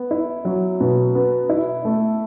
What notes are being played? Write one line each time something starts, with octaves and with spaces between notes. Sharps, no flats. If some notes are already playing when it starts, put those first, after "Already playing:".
Already playing: B3
E4
F#3
B2
B3
E4
A3